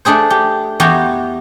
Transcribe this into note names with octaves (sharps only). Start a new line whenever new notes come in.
A3 D4 G#4 C5
G4
E2 F#4 G4 A#5